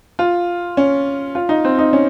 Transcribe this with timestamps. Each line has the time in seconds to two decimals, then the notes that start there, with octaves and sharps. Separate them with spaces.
0.19 F4
0.77 C#4
1.35 F4
1.49 D#4
1.65 C4
1.79 D#4
1.93 C#4